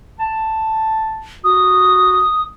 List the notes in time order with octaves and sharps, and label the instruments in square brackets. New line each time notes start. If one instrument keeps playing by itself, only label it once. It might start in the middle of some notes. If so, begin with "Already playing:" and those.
[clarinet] A5
[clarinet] F#4 [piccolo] D#6